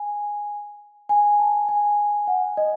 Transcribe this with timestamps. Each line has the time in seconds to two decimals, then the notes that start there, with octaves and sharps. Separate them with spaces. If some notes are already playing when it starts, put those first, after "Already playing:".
Already playing: G#5
1.09 G#5
1.40 A5
1.69 G#5
2.27 F#5
2.57 D#5